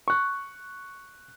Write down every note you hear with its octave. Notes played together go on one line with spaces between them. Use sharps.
C#6 F#6